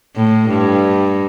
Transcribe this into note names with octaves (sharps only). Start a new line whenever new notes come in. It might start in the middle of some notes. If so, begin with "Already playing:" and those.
A2
G2